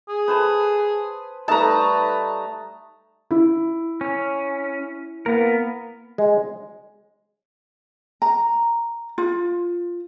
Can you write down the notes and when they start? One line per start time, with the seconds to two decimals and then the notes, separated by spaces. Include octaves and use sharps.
0.09 G#4
0.28 B4 C5 A5
1.48 G3 A3 D#4 B4 A5 A#5
3.31 E4
4.01 C#4
5.26 A#3 B3 A#4
6.18 G#3
8.22 A#5
9.18 F4